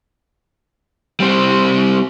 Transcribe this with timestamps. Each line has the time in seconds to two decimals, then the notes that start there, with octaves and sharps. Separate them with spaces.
1.20 G3 C4